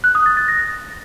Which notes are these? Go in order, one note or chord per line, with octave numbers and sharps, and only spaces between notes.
F#6
D#6
A6
A6
A#6